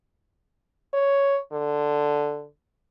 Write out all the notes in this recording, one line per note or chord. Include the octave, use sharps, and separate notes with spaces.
C#5
D3